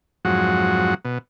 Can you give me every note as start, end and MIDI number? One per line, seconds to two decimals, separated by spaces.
0.25 0.94 41
0.25 0.94 44
0.25 0.94 54
0.25 0.94 66
1.05 1.18 47